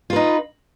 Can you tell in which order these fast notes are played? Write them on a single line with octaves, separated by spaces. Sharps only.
F4 B4 D#4